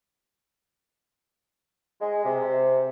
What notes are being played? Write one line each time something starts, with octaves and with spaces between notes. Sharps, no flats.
G#3
C3